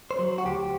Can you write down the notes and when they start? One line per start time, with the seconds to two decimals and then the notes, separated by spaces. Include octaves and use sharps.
0.11 C5
0.19 F#3
0.38 F#4
0.45 D2 G4